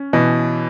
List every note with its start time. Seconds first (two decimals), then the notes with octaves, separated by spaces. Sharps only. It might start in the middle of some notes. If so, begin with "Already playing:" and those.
Already playing: C#4
0.13 B2 E3